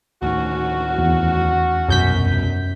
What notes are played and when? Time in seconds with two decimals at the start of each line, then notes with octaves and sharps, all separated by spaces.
0.22 D2 A2 D#3 C#4 F#4
0.98 E2
1.89 D1 C2 F#2 B2 G6 B6